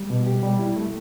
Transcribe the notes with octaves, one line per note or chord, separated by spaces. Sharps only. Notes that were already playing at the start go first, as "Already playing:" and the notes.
Already playing: G3
B2
G4
G3
E4
A3